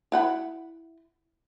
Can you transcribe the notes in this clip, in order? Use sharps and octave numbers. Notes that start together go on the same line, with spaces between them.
E4 F#5 B5